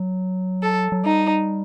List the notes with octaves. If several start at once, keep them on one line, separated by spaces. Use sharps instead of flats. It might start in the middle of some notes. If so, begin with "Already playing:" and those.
Already playing: F#3
A4
F#3
G3 D#4